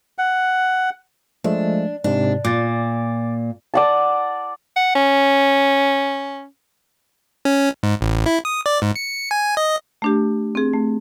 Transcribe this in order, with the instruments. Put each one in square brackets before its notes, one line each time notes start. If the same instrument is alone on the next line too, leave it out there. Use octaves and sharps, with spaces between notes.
[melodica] F#5
[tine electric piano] F3 G#3 A3 [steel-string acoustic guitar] D4
[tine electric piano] G#2 C3 [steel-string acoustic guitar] D4
[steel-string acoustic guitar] A#2 [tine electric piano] D6 A6
[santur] D5 F#5 A5
[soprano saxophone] F#5
C#4
[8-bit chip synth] C#4
G#2
A1
E4
D#6
D5
G#2
C#7
G#5
D#5
[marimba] A3 D4 G4
C4 G#4
A3